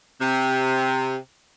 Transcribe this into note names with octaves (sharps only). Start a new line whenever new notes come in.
C3